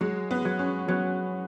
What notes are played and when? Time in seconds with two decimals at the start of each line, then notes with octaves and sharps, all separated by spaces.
0.01 F#3 G#3
0.31 B3
0.45 F#3
0.59 C#4
0.88 F#3 B3